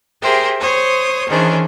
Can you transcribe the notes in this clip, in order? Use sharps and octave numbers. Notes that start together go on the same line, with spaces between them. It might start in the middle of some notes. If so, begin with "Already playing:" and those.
G4 G#4 A#4 C5 E5 G5
C5 C#5 D#6
D#3 E3 C#4 D4 G#4 C5